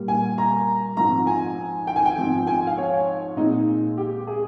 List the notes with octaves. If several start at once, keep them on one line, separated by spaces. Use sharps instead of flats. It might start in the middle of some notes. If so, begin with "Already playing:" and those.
Already playing: A#2 G3 A#3
G#5
A#5
G#2 F3 C4 A#5
G#5
G5
G#5
G5
G#2 F3 C4
G#5
F5
C#5
A#2 G#3 C4 D#4
G4
G#4